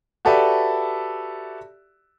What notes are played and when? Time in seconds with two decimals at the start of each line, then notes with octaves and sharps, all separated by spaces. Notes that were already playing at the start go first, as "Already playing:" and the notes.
0.25 F#4 G4 A4 B4 D5 E5